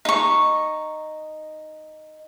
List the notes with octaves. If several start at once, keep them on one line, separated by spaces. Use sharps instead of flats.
D#4 C#6